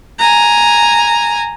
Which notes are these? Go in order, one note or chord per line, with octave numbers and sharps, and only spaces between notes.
G#5 A#5